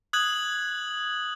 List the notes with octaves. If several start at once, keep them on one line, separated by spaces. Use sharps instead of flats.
D#6 F#6 G#6 F#7